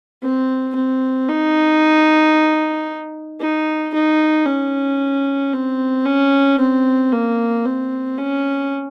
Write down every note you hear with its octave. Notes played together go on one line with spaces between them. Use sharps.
C4
C4
D#4
D#4
D#4
C#4
C4
C#4
C4
A#3
C4
C#4